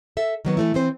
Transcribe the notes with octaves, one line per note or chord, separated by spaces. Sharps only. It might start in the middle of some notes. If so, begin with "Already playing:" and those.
A4 E5
D#3 F#3 B3
E3 A3 E4
E3 C4 C5